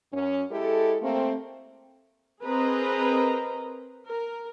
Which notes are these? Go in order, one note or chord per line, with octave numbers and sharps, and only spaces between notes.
F#2 C#4
G#3 E4 G4 A4
A3 A#3 C4
C4 G#4 A#4 B4 D#5 A#5
A#4